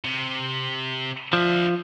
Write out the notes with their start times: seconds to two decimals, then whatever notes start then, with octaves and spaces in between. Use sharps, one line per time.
0.05 C3
1.33 F3 D4 E5